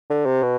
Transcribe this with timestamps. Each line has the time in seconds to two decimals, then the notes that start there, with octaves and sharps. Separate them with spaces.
0.10 D3
0.26 C3
0.42 B2